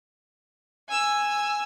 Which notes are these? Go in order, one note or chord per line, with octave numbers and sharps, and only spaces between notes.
G#5 E6